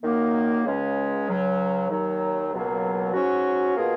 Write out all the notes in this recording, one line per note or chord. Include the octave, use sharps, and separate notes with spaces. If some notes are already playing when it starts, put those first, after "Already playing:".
F#2 D#3 A#3
C#2 C#3 G#3 C#4 G#4
C#2 C#3 F#3 C#4
D#2 D#3 F#3
C#2 B2 F#3 A#3
G#2 F#3 C#4 F#4
B2 A#3 F4 G#4